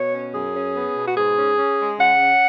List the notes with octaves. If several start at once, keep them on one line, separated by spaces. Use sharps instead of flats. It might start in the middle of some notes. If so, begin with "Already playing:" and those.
Already playing: B2 C#5
C#4
F#2 G#4
C#4
B3
B2
F#4
G#2 G#4
C#4
C#4
G#3
C#3 F#5
C#4